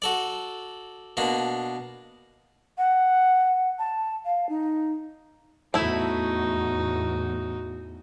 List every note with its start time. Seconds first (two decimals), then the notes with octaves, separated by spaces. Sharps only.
0.02 F#4 A4 D5
1.17 B2 A#3 D4
2.78 F#5
3.79 A5
4.25 F5
4.49 D#4
5.74 E2 A2 A3 D#4 E4 F#4